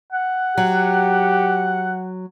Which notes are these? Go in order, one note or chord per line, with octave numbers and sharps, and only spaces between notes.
F#5
F#3 G4